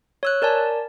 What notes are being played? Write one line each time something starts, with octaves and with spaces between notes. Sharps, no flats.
C#5 E6 F#6
A#4 D5 G#5 A5